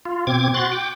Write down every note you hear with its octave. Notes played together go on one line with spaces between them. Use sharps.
F4
B2 C4 D6 G#6
F#4 C6 F#6 A6
G5 D6